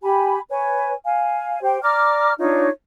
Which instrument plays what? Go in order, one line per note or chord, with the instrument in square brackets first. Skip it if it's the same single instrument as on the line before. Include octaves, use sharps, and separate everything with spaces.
[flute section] G4 G#5 B5
B4 C#5 G#5
F5 G#5
G4 C5 G5
D5 A#5 D6 F6
D4 D#4 F4 C#5